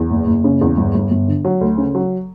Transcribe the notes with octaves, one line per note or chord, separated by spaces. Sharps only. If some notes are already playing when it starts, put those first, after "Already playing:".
Already playing: E2
F#1
F#1
C#3
E2
G1
G1
G1
D3
F#3
D2
C#3
F#3